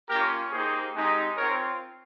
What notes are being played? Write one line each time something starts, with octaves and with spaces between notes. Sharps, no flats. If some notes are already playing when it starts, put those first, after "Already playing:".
A#3 C#4 F4 G4 A#4
A#3 D#4 G4 G#4 C5
G#3 C4 D#4 G4
C4 F4 A#4 C#5